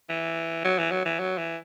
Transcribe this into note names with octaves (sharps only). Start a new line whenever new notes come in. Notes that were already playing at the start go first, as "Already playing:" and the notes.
E3
F#3
E3
F#3
E3
F#3
E3